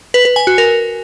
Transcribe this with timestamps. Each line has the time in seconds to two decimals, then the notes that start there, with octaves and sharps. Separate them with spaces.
0.14 B4
0.25 B4
0.36 G#5
0.47 F#4
0.58 A#4